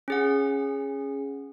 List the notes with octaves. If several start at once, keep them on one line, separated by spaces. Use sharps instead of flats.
C#4 G#4 F#5